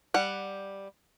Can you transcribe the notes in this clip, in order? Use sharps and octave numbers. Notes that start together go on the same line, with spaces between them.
G3 F#5